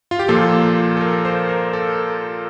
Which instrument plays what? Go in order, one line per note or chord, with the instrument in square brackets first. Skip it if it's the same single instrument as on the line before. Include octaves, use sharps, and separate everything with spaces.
[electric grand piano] F4
G4
A#2 F3 A#3 F4 A4
A4
A#4
C5
A#4
A4